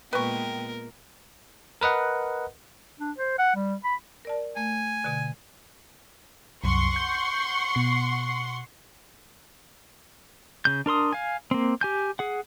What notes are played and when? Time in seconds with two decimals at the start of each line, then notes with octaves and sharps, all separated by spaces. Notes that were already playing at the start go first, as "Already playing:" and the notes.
0.13 A#2 G#3 B3 A#4 B4 G5 C#6
1.81 A#4 B4 D#5 F#5
3.00 D4
3.18 C5
3.38 F#5
3.55 G3
3.84 B5
4.25 A#4 D5 A5
4.57 A3 G#5
5.04 B2 D3
6.64 C2 F#2 F#5 C6 C#6
6.96 G6
7.75 B2 C7
10.65 C#3 G6
10.86 D4 A#4 C6 D#6
11.13 F5 G#5
11.51 A#3 C4
11.81 G4 G#5 G6
12.19 G#4 F#5